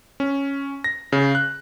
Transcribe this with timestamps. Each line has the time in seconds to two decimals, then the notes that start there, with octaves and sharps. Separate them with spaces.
0.20 C#4
0.84 A#6
1.12 C#3
1.35 F#6